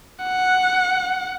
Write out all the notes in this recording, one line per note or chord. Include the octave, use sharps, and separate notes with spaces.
F#5